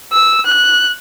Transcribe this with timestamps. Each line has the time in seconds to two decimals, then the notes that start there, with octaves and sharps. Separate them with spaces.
0.12 E6
0.46 F#6